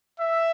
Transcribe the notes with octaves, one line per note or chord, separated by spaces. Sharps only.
E5